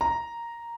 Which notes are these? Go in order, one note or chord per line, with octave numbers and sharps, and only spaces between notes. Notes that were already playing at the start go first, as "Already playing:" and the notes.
A#5